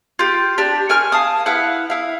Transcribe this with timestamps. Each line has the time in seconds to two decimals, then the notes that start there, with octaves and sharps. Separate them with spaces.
0.19 F4 G4
0.58 D4 G4
0.89 A#4 G#5 C#6 F6
1.12 F5 A5 D#6
1.46 E4 B4 F5 F#5
1.90 E4 F5